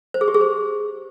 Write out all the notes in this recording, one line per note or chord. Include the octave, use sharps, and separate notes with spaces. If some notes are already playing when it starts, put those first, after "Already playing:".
C5
G#4
G4
G#4
C5